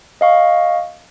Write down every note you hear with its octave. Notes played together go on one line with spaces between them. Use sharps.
D#5 F5 C#6